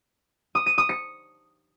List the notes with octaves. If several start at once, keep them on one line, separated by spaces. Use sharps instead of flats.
D#6
D#7
D#6
C#7